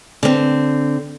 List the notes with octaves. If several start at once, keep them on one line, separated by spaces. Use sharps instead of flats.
D3 C4